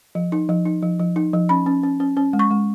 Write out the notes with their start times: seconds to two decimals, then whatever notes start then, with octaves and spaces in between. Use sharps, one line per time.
0.15 F3
0.32 D#4
0.49 F3
0.66 D#4
0.83 F3
0.99 F3
1.16 D#4
1.33 F3
1.49 C#4 B5
1.66 C#4
1.83 C#4
2.00 C#4
2.17 C#4
2.33 G#3
2.39 C#6
2.51 G#3